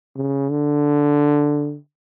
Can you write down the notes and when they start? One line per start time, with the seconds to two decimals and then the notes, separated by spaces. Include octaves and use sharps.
0.16 C#3
0.51 D3